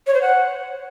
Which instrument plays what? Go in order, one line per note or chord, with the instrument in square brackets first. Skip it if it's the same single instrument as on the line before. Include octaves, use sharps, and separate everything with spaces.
[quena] C#5
C5
F#5